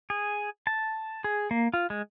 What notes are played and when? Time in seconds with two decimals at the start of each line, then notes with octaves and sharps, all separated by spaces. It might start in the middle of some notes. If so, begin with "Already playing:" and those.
0.10 G#4
0.67 A5
1.24 G#4
1.51 A#3
1.74 F4
1.90 G#3